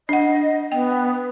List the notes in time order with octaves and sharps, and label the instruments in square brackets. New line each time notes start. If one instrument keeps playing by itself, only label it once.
[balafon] D4 F#5 [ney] D#5
[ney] B3 [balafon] G5